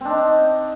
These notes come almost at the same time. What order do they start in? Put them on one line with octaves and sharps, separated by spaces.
C4 D4 D#4